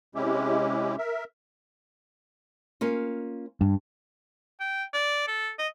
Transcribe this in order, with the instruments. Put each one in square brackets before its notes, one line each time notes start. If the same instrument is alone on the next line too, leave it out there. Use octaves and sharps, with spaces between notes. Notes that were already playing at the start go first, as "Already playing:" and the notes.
[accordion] C3 G#3 C#4 E4 G4
A#4 E5
[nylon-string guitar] A#3 C#4 F4
[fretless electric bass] G2
[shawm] G5
D5
A4
D#5